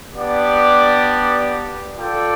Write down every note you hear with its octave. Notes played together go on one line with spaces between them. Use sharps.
B3 D4 G4 D5
F4 A4 D5 G5